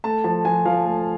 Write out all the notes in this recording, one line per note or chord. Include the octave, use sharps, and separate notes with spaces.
A3 A5
F3 A5
F3 G#5
F3 F5
A3